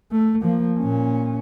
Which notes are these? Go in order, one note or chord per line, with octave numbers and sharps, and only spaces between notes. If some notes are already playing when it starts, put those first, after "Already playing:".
A3
F3 A#3
A#2 C#4